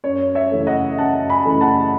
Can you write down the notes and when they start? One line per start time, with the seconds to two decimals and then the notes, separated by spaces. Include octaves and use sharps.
0.04 F#2 C#5
0.35 C#5 E5
0.52 C#3 E3 A3
0.67 D#5 F#5
0.98 F#2 F#5 A5
1.30 G#5 B5
1.45 C#3 E3 A3
1.61 F#5 A5